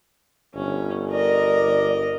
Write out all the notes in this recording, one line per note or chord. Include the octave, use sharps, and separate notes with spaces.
G1 C#4
A#4 D5 D#5